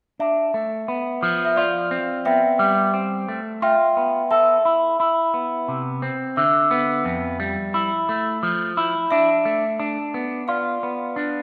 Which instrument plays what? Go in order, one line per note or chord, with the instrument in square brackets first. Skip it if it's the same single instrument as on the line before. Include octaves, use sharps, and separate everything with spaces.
[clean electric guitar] D4 [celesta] E5
[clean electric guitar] A3
B3
F3
[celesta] E5
[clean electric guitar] F4 [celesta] D5 F5
[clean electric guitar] C4
[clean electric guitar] B3 [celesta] E5 G5
[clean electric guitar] G3
C4
A3
[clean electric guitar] F4 [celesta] E5 G5
[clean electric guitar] B3
[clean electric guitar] A4 [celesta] E5
[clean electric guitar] E4
E4
B3
C3
C4
[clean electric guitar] D3 [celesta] E5
[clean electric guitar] B3
F2
G3
E4
A3
F3
E4
[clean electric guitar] D4 [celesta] E5
[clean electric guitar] A3
D4
B3
[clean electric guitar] F4 [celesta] D5 F5
[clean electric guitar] B3
D4